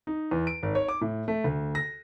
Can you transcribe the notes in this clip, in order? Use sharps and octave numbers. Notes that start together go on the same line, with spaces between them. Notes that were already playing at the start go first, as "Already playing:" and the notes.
D#4
E2
D7
G#1
C#5
D6
A2
A3
D2
A#6